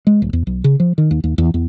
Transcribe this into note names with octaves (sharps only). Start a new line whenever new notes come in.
G#3
D#1
E2
B1
C#3
F3
D#3
D#2
D#2
E2
E2